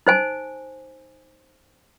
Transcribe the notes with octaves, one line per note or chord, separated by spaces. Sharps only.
D#4 C5 G#5